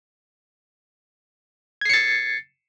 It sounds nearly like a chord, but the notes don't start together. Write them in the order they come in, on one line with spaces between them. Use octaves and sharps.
G#6 C7 C#7 A6